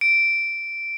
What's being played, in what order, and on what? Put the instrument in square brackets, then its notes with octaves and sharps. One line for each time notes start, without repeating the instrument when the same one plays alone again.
[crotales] D7